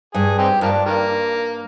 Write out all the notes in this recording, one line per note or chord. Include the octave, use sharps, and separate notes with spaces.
G2 G#4
C4 D#4 G4
G2 F3 A#3 D4
D#3 G3 A#3